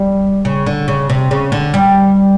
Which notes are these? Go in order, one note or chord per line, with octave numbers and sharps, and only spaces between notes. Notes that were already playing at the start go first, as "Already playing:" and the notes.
Already playing: G3
C#3
D3
C#3
C3
C#3
D3
G3